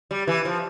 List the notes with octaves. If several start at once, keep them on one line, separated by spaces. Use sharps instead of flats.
G3
E3
F3